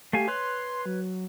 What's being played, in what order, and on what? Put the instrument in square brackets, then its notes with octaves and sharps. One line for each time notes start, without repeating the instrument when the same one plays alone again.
[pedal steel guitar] A3 F5 G#5 [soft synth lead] G4
[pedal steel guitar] B4 C#5 F#6 [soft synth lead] C6
[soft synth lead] F#3